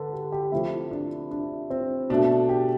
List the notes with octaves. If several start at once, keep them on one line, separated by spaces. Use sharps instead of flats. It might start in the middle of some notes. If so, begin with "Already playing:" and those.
Already playing: D3 A4 B4
G4
G4
C3 F3 A3 E4
D4
D4
C4
B2 A3 D4
G4